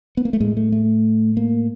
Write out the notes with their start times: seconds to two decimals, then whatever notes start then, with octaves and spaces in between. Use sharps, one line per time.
0.17 B3
0.25 A#3
0.33 A3
0.40 A2 G#3
0.57 A3
0.72 A3
1.37 A#3